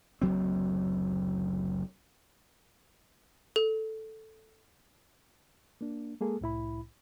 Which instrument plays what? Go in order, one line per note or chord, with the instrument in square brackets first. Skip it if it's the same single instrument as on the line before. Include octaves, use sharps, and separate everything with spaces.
[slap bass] F#1 D2 F#3 C4
[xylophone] A4
[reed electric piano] A#3 D4
G#3 A#3 G#4 A4
C2 A2 E4 B5